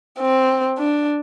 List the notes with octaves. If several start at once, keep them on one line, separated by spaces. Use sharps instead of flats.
C4
D4